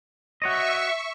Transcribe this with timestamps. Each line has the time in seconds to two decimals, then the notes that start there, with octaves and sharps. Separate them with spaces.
0.42 F#4 C#5 D#5 E5 C#6